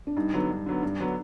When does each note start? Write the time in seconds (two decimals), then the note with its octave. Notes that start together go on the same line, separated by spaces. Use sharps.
0.07 D4
0.17 G2 D#4
0.34 D3 F#3 B3
0.50 G2
0.66 D3 F#3 B3
0.82 G2 D4
1.00 D3 F#3 B3